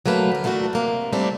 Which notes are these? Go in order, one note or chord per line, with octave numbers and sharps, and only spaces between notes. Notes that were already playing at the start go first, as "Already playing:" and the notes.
F#3 A3 A#3 B4
D2 A#4
E3 A3 B3 D4 F#4 A#4
C3 A#3
G3 A3 C4 D4 E4